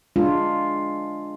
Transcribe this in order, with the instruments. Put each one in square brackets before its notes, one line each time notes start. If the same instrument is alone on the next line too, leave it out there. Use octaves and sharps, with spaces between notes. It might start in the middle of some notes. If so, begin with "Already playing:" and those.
[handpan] G#3 D4 F4